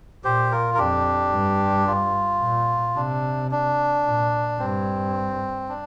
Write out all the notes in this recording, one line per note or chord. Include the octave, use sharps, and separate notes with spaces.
A#2 G4 C5
F4 A#4
A#4
F2 D4 G4
G2
F4
A#2
C3 D4
D4
A#2
G2 C4
D4